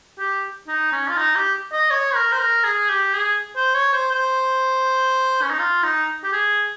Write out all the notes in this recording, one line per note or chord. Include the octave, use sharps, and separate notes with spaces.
G4
D#4
C#4
F4
D#4
G4
D#5
C#5
A#4
C5
A#4
G#4
G4
G#4
C5
C#5
C5
C5
C#4
D#4
F4
D#4
G4
G#4